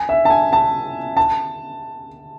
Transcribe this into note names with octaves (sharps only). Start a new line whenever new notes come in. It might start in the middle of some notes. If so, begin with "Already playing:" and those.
Already playing: G#5
E5
A5
G#5
A5
A5